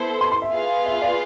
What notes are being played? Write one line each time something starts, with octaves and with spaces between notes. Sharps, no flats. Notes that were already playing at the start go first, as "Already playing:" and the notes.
Already playing: B3 E4 A4 C5
C6
C6
E5
B3 F4 G#4 B4 F5
E5
D5